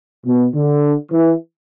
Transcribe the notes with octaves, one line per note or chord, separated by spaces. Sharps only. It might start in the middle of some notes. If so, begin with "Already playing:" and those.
B2
D3
E3